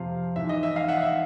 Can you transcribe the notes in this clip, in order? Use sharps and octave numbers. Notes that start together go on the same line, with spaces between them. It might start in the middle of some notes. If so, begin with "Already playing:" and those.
Already playing: F2 C3 F3 F5
G#2 E3 E5
D#5
E5
D#5 F5
E5 F#5
E5